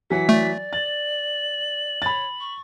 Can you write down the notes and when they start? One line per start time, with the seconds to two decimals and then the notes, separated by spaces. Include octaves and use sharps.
0.10 E3 F#3 F#5 B6
0.29 A3 D5
0.73 A6 F#7
2.02 C#5 B5 A6
2.40 C#6